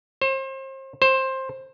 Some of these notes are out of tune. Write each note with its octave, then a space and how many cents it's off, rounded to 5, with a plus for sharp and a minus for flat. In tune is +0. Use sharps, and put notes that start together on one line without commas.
C5 +35
C5 +15